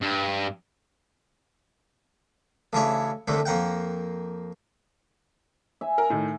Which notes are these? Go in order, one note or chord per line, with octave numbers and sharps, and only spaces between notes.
G2
A1 C#3 D4 E4 C#5
C2 A2 D3 A3
F2 A#3 F#5 G5
E5 G#5
A#4
A2 D#3